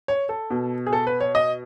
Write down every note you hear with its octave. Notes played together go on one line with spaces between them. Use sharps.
C#5
A4
B2
G#4
A4
B4
C#5
D#5